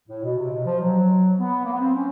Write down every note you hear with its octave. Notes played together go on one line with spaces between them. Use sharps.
A2
B2
C3
B2
F3
F#3
B3
A#3
B3
C4
C#4